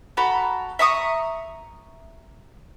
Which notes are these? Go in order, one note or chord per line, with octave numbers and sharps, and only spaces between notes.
F#4 A4 A#5 B5
E5 A#5 C#6 D#6